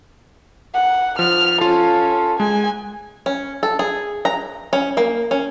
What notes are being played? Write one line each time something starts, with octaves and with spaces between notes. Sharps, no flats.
F#5
F3 F6
C#4 F4 A4 F5
G#3 G#5
C#4
A4
G#4
A#5
C#4
A#3
C#4